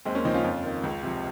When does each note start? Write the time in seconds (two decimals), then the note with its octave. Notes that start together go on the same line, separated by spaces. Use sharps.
0.05 D#2 G#3 C4
0.15 A#3 C#4
0.25 C#3 F3 C4 D#4
0.34 C#4 F4
0.44 F2
0.63 D#3
0.84 C#2
1.03 C3 F3